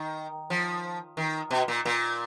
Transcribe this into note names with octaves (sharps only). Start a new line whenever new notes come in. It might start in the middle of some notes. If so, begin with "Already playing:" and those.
Already playing: D#3
F3
D#3
B2
A#2
A#2